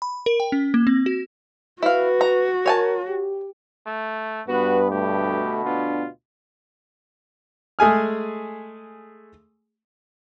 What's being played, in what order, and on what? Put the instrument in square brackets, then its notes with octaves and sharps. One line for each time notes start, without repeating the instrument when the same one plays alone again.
[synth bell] B5
A#4
G5
C#4
A#3
C4
F#4
[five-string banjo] E4 F5 [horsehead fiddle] F#4 [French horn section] B4
[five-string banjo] A#5
[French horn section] A#4 [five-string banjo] C#5 G#5 A5
[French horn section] G4
[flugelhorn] A3
[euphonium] G2 [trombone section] B3 [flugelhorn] F#4 [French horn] B4
[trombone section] D2 B2 [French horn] A3 [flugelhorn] G4
[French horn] B3 [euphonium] D4 [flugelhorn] F4
[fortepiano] G#3 A3 G#4 G#5 F6